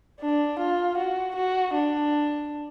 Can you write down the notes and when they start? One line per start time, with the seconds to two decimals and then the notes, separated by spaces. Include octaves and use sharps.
0.21 D4
0.59 F4
0.97 F#4
1.36 F#4
1.74 D4